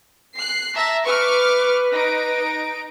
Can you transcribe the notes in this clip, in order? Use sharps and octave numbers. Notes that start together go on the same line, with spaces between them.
F#6 C7
E5 A5 A#5
B4 C#6 D6 F6
D#4 D7